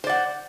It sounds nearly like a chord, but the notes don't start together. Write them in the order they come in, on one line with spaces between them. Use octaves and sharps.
C5 D5 F#5